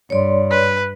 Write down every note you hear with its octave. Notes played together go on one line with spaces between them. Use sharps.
G2 C#5 D5 C6
B4